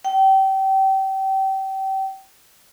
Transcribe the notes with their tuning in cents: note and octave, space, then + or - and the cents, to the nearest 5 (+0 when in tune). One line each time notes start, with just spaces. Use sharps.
G5 -30